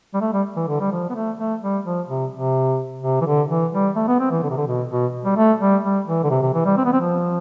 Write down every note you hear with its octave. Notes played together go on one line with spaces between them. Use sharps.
G3
A3
G3
E3
D3
G3
F3
B3
A3
A3
G3
F3
C3
C3
C3
E3
D3
E3
G3
A3
B3
C4
E3
D3
C3
D3
B2
B2
G3
A3
G3
G3
E3
D3
C3
C3
E3
G3
C4
B3
C4
F3